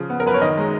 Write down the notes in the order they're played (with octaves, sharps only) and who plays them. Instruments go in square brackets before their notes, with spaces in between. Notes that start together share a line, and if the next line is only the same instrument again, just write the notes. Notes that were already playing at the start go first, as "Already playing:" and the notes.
Already playing: [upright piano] C#3 F3
B3
A#4
F#2 B4
C#5
D#3 D#5
G#3